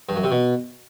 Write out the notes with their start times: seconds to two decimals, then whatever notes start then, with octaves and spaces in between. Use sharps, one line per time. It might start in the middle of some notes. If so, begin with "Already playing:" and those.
0.09 G2
0.16 F#2
0.24 C3
0.31 B2